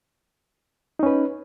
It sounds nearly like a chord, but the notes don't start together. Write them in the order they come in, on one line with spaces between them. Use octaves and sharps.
D#4 C#4 B4